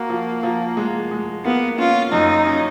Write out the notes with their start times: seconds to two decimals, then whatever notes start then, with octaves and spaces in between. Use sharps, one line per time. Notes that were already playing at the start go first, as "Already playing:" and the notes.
Already playing: A#3 F#4
0.10 F3
0.43 F3
0.77 G#3
1.11 G#3
1.45 A#3 B3
1.78 C#4 F4
2.12 F#2 D#4
2.47 C#4